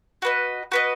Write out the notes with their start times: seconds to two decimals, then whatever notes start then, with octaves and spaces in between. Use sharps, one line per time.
0.22 F#4 B4 D#5
0.72 F#4 B4 D#5